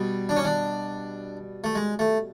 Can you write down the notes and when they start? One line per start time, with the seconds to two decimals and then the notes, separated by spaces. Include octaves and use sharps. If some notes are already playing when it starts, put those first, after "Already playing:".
Already playing: B2 G3
0.29 D4
0.36 C#4
0.45 D4
1.64 A3
1.75 G#3
1.99 A3